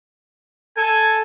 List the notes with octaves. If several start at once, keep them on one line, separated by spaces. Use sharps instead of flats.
A4 G#5